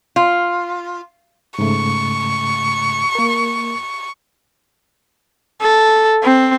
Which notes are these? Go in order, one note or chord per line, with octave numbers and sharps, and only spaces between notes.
F4
G#2 C#3 A3 C#6
A#3 A#4
A4
C4